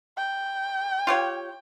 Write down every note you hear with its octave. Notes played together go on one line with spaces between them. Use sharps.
G5
F4 G4 C#5